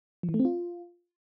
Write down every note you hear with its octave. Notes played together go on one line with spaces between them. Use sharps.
F3
E3
A3
C4
F4